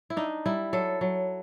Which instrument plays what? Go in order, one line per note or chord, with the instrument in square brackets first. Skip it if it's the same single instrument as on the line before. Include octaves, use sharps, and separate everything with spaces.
[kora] E4
D4 D#4
G3 E4
F#3 A4
F#3